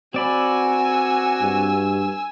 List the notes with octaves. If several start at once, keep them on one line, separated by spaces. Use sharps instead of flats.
C4 F#4 D5 G#5 B5 E6
G2